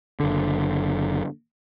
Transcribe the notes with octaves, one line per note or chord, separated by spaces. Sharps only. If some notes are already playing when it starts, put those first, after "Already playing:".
F#1 D3